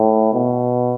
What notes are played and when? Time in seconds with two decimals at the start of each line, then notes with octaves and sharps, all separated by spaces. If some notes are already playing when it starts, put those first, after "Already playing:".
Already playing: A2
0.33 B2